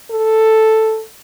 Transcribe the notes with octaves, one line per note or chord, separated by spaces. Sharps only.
A4